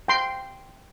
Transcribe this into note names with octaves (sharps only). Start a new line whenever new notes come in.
G5 C6